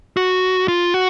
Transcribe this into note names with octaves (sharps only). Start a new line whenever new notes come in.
F#4
F4
F#4